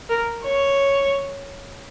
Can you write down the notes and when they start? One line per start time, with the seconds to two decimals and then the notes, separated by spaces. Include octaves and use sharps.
0.09 A#4
0.45 C#5